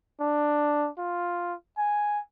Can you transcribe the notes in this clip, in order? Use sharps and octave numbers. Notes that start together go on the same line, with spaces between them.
D4
F4
G#5